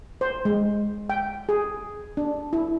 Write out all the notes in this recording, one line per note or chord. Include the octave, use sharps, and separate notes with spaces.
C5
G#3
G5
G#4
D4
E4